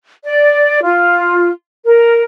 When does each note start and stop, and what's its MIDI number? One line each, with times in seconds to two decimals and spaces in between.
0.24 0.80 74
0.83 1.49 65
1.85 2.23 70